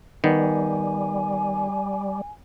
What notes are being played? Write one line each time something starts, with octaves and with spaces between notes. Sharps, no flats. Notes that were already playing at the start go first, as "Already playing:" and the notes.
D#3 G3 B3 G#5